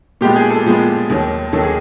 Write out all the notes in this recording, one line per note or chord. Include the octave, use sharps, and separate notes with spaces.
A#2 F3 G#3 B3 G4
G#4
A4
A#2 F3 G#3 B3
D#2 D#3 F#3 A#3
D#2 D#3 F#3 A#3 A4
G#4